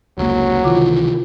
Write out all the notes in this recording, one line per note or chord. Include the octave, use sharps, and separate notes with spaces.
F1 C#2 F#3 A#3
C#2 C3 D#3 E3 F4 D6